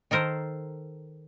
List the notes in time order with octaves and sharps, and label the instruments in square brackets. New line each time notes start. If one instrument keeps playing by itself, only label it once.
[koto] D#3 A4 A#4 C5